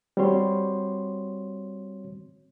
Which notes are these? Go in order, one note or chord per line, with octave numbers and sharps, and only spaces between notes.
G3 C4 F#4 C#5 C6